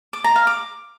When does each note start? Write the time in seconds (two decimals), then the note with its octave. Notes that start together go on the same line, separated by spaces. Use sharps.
0.13 D6
0.24 A#5
0.36 F5
0.47 D6